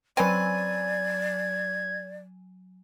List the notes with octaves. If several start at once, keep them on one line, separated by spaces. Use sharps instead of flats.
F#3 C4 C#4 B4 D5 G#5 G#6 D#7